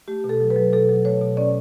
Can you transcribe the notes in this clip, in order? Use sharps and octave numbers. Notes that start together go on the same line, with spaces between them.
A3 G4
B2
A4
F#3
B4
F#3
B2 A4
F#3
A3 C#5
B2
C#4 D5